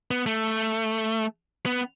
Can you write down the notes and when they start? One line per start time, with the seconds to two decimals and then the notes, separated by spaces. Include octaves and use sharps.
0.11 B3
0.26 A3
1.66 B3